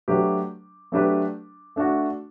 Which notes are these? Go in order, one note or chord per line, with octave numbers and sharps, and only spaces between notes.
F#3 A3 D4 G4 B4
F#3 A3 D4 G4 B4
A3 D4 F#4